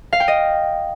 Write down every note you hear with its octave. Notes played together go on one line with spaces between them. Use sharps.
F5
G5
D#5